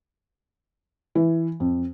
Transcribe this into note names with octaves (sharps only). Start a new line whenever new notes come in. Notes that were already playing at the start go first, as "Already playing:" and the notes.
E3
F2